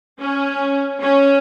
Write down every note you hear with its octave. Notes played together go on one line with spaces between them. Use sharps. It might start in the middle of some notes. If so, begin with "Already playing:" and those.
C#4
C#4